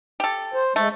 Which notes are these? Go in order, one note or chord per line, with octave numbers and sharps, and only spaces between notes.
G4 A4
C5
G#3 A3